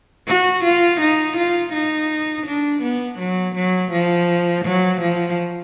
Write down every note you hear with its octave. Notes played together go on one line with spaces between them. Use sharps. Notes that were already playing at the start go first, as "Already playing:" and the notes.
F#4
F4
D#4
F4
D#4
D4
B3
F#3
F#3
F3
F#3
F3